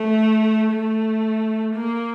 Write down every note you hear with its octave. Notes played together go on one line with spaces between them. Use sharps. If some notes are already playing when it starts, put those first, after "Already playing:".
Already playing: A3
A3
A#3